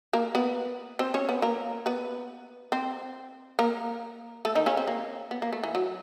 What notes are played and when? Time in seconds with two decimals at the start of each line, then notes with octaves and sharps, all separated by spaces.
0.13 A#3 A#4
0.35 B3 B4
0.99 C4 C5
1.14 C#4 C#5
1.29 B3 B4
1.42 A#3 A#4
1.86 B3 B4
2.72 C4 C5
3.59 A#3 A#4
4.45 A3 A4
4.55 D#3 D#4
4.66 C#3 C#4
4.77 C4
4.87 A#3
5.31 B3
5.42 A#3
5.53 A3
5.64 E3
5.75 F#3